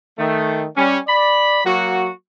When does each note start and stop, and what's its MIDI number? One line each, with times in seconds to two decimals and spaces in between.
0.18 0.66 51
0.18 0.66 57
0.76 0.98 55
0.76 0.98 61
1.07 1.64 74
1.07 1.64 83
1.65 2.10 54
1.65 2.10 58
1.65 2.10 66